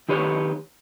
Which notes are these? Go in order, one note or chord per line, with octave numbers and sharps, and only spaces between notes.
D#3 G4 B4 C#5